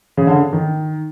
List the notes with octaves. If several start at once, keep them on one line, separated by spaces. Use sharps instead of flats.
C#3
D3
D#3